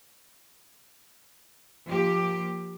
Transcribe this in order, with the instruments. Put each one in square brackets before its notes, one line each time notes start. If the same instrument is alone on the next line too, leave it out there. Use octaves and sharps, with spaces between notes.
[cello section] F3 A#3 G4